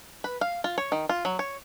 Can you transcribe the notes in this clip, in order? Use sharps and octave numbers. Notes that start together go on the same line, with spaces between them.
B4
F5
F4
C#5
D#3
F4
F#3
C#5